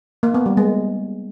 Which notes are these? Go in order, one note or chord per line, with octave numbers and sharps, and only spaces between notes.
A#3
B3
G3
G#3